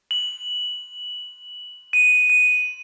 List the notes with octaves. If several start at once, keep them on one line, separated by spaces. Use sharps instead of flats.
F#7
D#7
D#7